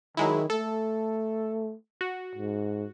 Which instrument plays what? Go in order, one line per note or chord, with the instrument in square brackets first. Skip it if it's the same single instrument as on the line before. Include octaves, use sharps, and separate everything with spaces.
[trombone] D#3 [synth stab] F#3 G#3 E4
[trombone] A3 [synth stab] A4
[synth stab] F#4
[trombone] G#2